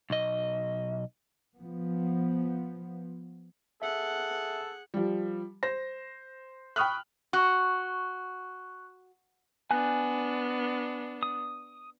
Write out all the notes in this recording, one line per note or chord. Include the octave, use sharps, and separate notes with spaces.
B1 D#5
F3 B3
G#4 A4 E5 F#5
F3 G3
C5 A#6
G5 B5 C#6 D#6 F6 F#6
F#4 C#6 F#6
B3 D4 G#5 F#6
D#6